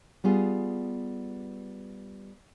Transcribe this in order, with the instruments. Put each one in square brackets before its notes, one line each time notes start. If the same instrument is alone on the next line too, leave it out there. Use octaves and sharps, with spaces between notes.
[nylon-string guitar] G3 B3 F4 G#4